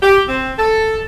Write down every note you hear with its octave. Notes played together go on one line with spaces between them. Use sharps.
G4
C4
A4